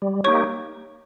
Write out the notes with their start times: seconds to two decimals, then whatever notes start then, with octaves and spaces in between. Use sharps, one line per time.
0.02 G3
0.24 A#3 D#4 G4 C#5 C#6